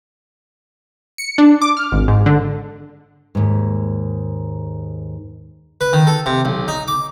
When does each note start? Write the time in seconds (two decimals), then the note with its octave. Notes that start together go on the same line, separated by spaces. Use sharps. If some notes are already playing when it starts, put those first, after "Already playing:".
1.18 C#7
1.38 D4
1.62 D6
1.77 F6
1.92 G#1
2.08 G#2
2.26 D3
3.35 D#2 G#2
5.81 B4
5.93 D#3
6.07 A4
6.26 C3
6.45 B1
6.68 D#4
6.88 D6